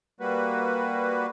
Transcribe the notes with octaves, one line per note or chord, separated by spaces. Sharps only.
G3 A#3 F#4 B4